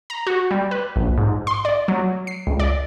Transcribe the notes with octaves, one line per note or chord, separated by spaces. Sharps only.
A#5
F#4
G3
B4
A#1
G#2
C6
D5
F#3
C7
C#2
D5